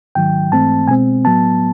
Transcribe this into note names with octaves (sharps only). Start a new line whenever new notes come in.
G#2 D#3 F#3 G5
G#2 E3 A3 C4 A5
B2 G#3 C4 G#5
A2 F#3 B3 A5